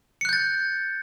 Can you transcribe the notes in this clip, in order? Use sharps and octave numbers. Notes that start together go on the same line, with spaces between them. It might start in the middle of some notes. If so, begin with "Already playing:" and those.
F#6 G6 A6 C#7